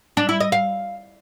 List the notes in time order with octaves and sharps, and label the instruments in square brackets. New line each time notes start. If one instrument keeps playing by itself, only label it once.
[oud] D4
E4
D#5
F5